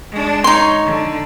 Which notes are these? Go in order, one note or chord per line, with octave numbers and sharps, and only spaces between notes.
G#3 D4
D#4 C#5 C6
D3